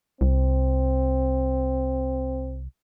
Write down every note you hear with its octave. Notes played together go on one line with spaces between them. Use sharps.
C2 C4